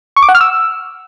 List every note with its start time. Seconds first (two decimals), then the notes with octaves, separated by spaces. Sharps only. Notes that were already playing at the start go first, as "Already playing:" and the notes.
0.16 C#6
0.23 D6
0.29 F#5
0.35 F6
0.41 E6